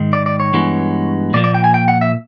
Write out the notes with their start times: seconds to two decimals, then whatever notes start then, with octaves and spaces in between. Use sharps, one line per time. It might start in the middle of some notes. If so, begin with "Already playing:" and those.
Already playing: G#2 D#3 G#3
0.13 D5
0.26 D5
0.40 C#5
0.53 G2 E3 G#3 B3
1.34 A#2 F3 A#3 D5
1.44 D5
1.54 G5
1.64 G#5
1.74 G5
1.88 F#5
2.01 E5